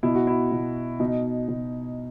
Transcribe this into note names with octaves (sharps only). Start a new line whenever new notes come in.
B2 E4
F#4
E4
B2
B2 D#4
B2